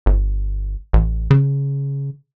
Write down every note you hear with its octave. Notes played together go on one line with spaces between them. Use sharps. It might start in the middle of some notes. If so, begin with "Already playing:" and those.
G1
A1
C#3